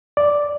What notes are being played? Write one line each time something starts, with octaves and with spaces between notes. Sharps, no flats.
D5